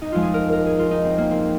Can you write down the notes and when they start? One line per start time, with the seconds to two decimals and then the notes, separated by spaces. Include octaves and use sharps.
0.02 D#4
0.12 F2 F3 G#3 F4
0.22 G#4
0.34 A#4
0.52 A#4
0.66 G#4
0.79 F4
0.91 D#4
1.04 C4
1.18 A#3
1.30 C4